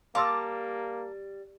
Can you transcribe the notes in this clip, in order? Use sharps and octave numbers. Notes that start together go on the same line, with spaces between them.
G3 A#3 F5 A5 A#5 C6 D6 E6